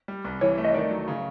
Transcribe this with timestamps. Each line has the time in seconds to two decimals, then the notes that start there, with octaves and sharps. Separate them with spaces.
0.08 G3
0.24 C2
0.41 E3 C#5
0.57 A3
0.65 D#5
0.74 D#3 D5
0.90 F#3
1.08 C#3